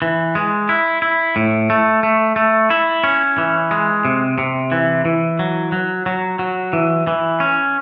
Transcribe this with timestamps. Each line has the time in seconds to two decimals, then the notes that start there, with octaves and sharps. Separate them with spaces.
0.02 E3
0.35 G#3
0.69 E4
1.02 E4
1.36 A2
1.70 A3
2.03 A3
2.36 A3
2.70 E4
3.04 C#4
3.38 E3
3.71 G#3
4.05 C3
4.38 C3
4.72 E3
5.05 E3
5.39 F#3
5.72 F#3
6.06 F#3
6.39 F#3
6.73 E3
7.07 E3
7.40 C#4